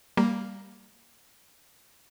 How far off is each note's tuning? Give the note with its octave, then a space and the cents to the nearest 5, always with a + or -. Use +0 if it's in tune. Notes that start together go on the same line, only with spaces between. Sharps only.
G3 +0 A#3 +0